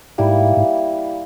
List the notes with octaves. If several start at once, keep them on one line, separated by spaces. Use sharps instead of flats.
G#2 G3 A#3 E4
G#2